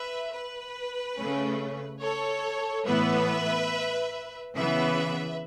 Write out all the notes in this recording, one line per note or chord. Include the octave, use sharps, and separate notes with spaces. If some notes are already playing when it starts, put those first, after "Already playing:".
Already playing: B4 E5
B4
C#3 A3 C#4
A4 C#5
A2 E3 B3 B4 E5
C#3 E3 B3 B4 E5